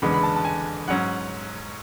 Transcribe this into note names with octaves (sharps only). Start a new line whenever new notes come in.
F#1 E2 D3 G#3 B3 B5
B5
A5
A5
G#5
G#2 F#3 C#4 F#5